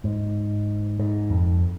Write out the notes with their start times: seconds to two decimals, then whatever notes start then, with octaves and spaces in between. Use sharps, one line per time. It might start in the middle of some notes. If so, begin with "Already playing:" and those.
0.04 G#2
0.99 G#2
1.30 F2